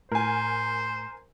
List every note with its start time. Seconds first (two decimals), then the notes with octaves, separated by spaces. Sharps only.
0.12 A2 A#4 C5 G#5